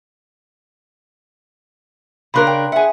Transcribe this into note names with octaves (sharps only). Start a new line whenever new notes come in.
C#3 D4 A#4 B5 C6 F#6
G5
G#4 E5 F#5 G#5